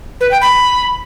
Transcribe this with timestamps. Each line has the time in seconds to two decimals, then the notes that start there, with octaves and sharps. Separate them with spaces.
0.21 B4
0.31 G5
0.42 B5